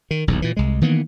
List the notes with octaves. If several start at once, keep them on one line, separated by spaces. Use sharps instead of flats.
D#3
D#1 B1 E2
A#2 E3
C2 G#3
D#3 E3 A#3 B3